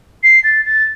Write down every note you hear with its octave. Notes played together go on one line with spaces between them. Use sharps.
C7
A6
A6